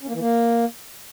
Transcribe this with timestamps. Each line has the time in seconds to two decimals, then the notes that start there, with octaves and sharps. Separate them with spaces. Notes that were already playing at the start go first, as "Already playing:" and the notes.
0.02 C#4
0.08 A#3
0.14 E3
0.20 A#3